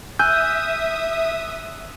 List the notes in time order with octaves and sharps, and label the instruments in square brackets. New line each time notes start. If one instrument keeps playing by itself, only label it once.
[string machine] E5 D#6 [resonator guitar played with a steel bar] G#5 [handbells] E6 F#6 [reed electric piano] G6